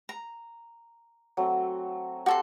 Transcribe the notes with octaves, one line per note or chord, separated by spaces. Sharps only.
A#5
F#3 A3 C4
F#4 G4 A4 C6